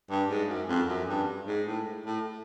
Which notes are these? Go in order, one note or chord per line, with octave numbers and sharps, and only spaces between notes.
G2
G#2
F#2
F2
F#2
G2
G#2
A2
A2